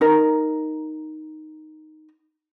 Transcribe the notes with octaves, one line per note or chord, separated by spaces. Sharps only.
D#4 A#4